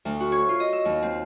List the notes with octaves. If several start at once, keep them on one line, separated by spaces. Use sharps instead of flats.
D2
F#4
C#5
F4
D#5
E6
D#2
C4